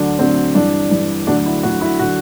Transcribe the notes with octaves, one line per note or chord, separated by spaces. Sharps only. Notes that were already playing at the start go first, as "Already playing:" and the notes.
Already playing: D2 D3 F#3 D4
D2 D3 F#3 C4
G2 E3 D4
G2 E3
D2 D3 F#3 D4
E4
D2 D3 F#3 F#4
E4
D3 F#3 F#4